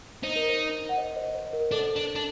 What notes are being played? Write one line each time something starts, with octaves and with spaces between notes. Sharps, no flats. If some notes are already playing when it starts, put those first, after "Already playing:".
D#4 C5
A#4
C5
F#5
C5 D#5
C5 D#5
C5
A#4
D4 A4
D4
D4